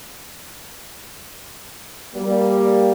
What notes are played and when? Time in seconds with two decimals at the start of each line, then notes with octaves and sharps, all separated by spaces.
2.15 G3 A#3